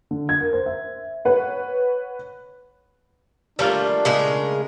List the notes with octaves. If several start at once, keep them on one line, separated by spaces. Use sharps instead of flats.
D3
G#6
A#4
C5
E5
B4 C#5 F#5
G3 A3 A#3 D4 F4
C#3 G#3 A#4